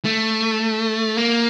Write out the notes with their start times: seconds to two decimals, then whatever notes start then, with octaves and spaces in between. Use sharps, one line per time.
0.05 A3
1.17 A#3